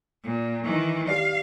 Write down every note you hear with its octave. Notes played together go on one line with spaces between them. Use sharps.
A#2
D#3 E3
G4 D5 F5